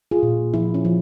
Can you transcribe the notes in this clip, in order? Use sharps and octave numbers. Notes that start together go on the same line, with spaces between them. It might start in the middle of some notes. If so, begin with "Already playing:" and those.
F4 G#4
A#2
F3 E4
C#4
F3